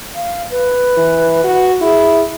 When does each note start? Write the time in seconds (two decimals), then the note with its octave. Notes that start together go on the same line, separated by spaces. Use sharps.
0.15 F5
0.51 B4
0.97 E3
1.44 F#4
1.81 E4 G#4